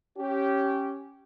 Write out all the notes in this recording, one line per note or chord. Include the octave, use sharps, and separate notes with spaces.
C#4 G4